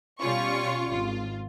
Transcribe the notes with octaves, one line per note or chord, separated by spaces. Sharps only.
B2 G3 C#4 F4 C#6
G#1 F4